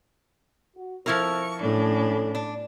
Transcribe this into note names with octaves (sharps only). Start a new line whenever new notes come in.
F#4
F3 C4 E4 A4 A#4 C5 C#6
A2 C#4 D4 A4
D4